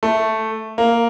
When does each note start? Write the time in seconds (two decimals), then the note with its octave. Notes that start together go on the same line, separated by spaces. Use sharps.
0.03 A3
0.78 A#3